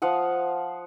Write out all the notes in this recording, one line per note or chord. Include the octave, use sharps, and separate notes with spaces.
F3 F5 F#5 D#6